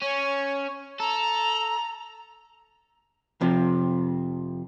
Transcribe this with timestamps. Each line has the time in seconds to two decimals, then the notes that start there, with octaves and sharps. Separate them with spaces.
0.02 C#4 C#5
1.00 A4 A#5
3.41 F2 C3 F3